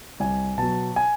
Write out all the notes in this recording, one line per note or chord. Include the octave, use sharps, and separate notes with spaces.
C2 G#5
B2 F#3 A5
G#5